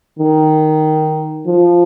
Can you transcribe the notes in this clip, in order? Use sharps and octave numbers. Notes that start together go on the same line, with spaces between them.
D#3
F3